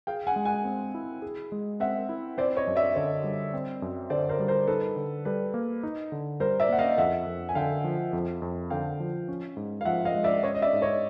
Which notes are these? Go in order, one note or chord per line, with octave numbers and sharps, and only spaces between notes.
G#4 F5 G5
F#5 G#5
G#3
F#5 G#5
C4
E4
G#4
G#3
C4 E5 F#5
E4
C4 C5 D5
C#5 D#5
F#2
D5 E5
D3 C#5 D#5
G3
C4
F#2
D3 C5 D5
A#4 C5
G3
A#4 C5
D#4 A4 B4
D3
G3 A4 B4
A#3
D#4
D3
G3 A#4 C5
D5 E5
A#3 F#5
D#5 F5
F2 E5 F#5
F2
G#5
D3 F5 G5
F3
F2
F2
D3 F5 G5
F3
C#4
G#2
F5
F3 E5 F#5
D#5 F5
G#3
D5 E5
C#4 C#5 D#5
D#5
D5 E5
G#2
C#5 D#5